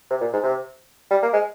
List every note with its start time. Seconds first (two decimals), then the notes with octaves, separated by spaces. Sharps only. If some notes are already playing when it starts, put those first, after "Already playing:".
0.10 C3
0.21 A#2
0.33 G#2
0.43 C3
1.10 G3
1.22 A#3
1.33 G#3